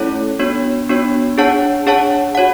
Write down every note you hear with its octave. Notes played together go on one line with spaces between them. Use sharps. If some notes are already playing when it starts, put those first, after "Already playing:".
Already playing: A3 C#4 E4 A4 C#5
B3 D4 F#4 C#5
B3 D4 F#4 C#5
D4 G#4 C#5 F#5 A5
D4 G#4 C#5 F#5 A5
F#4 C#5 F#5